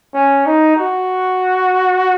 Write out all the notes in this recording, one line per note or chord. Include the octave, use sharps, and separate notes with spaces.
C#4
D#4
F#4